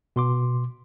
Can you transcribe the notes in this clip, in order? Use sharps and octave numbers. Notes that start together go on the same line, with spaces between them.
B2 C6 D6